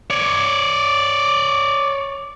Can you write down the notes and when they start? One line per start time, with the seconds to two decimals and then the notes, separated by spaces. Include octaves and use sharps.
0.10 C#5 D5